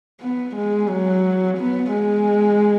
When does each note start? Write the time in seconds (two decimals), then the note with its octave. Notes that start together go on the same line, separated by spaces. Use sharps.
0.21 B3
0.56 G#3
0.89 F#3
1.58 B3
1.93 G#3